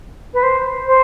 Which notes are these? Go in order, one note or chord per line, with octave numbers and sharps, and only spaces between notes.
B4
C5
C5